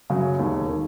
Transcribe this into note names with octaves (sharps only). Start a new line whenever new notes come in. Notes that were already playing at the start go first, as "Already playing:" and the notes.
F#2 C#3 F#3
E1 D#2 D#3
D#3